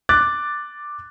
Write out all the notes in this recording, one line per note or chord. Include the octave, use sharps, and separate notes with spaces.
D6 F#6 A6